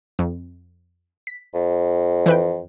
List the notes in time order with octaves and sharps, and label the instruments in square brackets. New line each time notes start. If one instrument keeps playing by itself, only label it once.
[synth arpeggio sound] F2
B6
[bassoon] F2
[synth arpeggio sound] E3 B4 G5